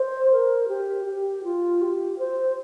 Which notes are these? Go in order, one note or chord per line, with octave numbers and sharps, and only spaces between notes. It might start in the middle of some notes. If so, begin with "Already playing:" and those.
Already playing: C5
A#4
G4
G4
F4
G4
C5